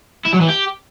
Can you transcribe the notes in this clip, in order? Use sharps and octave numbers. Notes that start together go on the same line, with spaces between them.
E4
F#3
E3
G4